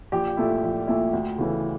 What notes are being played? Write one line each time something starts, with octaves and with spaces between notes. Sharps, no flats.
A#1 G4
A#2 A3 E4
A#1
A#2 A3 E4
D2
C#3 E3 A3